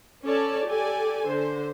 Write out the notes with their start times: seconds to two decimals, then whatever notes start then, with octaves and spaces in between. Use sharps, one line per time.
0.24 C#4 A4 C#5 D5 A5
0.66 G4 A4 D5 G#5
1.24 D3 C5